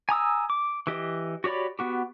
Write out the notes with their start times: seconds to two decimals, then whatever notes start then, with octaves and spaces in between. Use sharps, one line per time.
0.09 G#5 A#5 D#6 E6
0.50 D6
0.87 E3 G4 D#5
1.44 F#4 G4 C#5 D5 B5
1.79 B3 F#4 G4